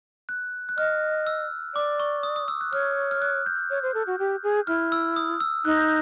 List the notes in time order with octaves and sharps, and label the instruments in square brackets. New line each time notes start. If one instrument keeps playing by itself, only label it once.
[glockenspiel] F#6
F#6
[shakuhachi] D#5 [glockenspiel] F6
[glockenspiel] E6
[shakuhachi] D5 [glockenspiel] D6
[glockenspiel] C#6
D#6
D#6
E6
F#6
[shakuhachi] C#5 [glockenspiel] F6
[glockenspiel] F6
F#6
G6
[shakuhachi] C#5
C5
A4
F#4
G4
G#4
[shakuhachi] E4 [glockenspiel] F6
[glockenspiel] E6
D#6
E6
[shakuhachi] D#4 [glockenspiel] F#6
[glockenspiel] G6